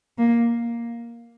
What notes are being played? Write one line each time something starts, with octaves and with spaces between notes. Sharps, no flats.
A#3